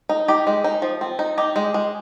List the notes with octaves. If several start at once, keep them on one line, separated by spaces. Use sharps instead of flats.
D#4
D#4 G4
G#3
D#4
F3
C4
D#4
D#4 G4
G#3
G#3